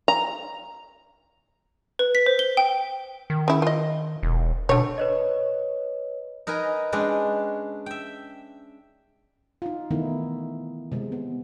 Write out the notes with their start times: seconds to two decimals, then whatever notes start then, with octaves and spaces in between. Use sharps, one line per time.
0.08 A#5
1.99 B4
2.15 B6
2.26 C5
2.39 G7
2.57 G5
3.30 D#3
3.48 C#3 E4
3.62 F4 D#5
4.23 E1
4.69 B2 D3 C#5
4.98 B4 C#5 D#5
6.47 D#4 A#4 B4 D#5 G#5
6.92 G#3 C#4 D4 B4 G5
7.86 E5 G5
9.62 D#4 F4
9.91 D#3 E3 A3 B3 D#4 E4
10.92 C3 G#3
11.12 B3